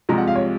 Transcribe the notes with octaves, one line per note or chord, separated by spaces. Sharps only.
C2 C3 F3 G#3 A#5
F#5
F5
C#5